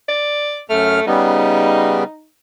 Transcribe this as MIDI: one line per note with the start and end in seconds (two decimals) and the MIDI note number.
0.08 0.62 74
0.70 1.00 42
0.70 1.05 57
0.70 1.00 89
1.07 2.04 49
1.07 2.04 55
1.07 2.04 59
1.07 2.27 63